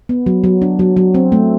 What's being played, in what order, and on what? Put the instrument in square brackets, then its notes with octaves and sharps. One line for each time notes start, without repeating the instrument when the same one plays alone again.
[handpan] B3
F#3
F#3
D4
F#3
F#3
C4
A3